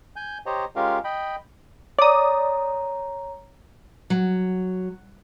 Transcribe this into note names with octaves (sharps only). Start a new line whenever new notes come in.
G#5 G6
G4 C5 C#5 D#5 A#5
G#3 C#4 F4 G4 A#4 F5
D#5 G5 B5
C#5 D5 A#5 D#6
F#3